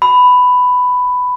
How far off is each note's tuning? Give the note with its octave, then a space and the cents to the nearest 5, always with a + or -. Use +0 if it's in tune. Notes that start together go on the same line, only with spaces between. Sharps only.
B5 +10